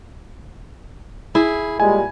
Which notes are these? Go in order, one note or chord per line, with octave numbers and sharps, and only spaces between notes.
E4 G#4
A#2 G3 G#3 G#5